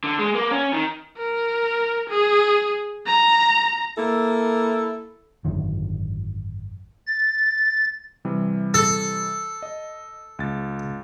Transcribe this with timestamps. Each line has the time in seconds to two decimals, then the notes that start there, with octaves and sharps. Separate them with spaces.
0.04 D3
0.19 G#3
0.35 A#3
0.51 C#4
0.73 D#3
1.18 A#4
2.09 G#4
3.06 A#5
3.97 A#3 E4 A4
5.45 G#1 F#2 D3 D#3
7.07 A6
8.25 C3 E3 G3
8.74 A4
9.62 D#5
10.39 C#2 A6